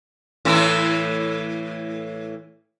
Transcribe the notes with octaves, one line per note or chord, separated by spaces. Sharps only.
A2 E3 E4